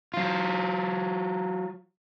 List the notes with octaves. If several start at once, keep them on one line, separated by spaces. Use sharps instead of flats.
F#3 F4